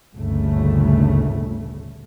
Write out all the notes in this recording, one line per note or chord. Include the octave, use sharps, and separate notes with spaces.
G1 D2 A#2 C#3 A3